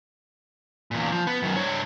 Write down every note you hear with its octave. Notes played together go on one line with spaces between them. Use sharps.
E2 A#2
F3
B3
F#2 D#3
G2 C#5